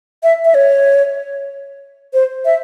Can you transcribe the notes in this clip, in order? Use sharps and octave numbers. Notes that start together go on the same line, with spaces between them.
E5
E5
C#5
C5
E5